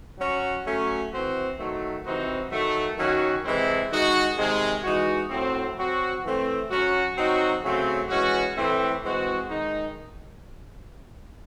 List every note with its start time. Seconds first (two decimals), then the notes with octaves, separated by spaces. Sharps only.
0.18 F#3 C#4 F#4
0.65 F#3 A3 C#4
1.12 E3 C4 F#4
1.58 D#3 F#3 A3
2.05 C3 E3 C4 D#4 F#4
2.51 D#3 F#3 A3
2.98 D#3 F#3 C#4 F#4
3.44 C3 E3 G#3 C4 E4
3.91 D#3 G#3 D#4 F#4
4.37 C3 D#3 G#3
4.83 E3 G#3 D#4 F#4
5.30 A2 F#3 C4
5.77 F#3 C4 F#4
6.24 E3 A3 C4
6.70 F#3 C#4 F#4
7.17 F#3 C4 D#4 F#4
7.63 C#3 F#3 A3 C4
8.09 E3 G#3 C#4 F#4
8.56 A2 E3 A3 C4
9.02 E3 G#3 C4 F#4
9.50 D#3 G#3 D#4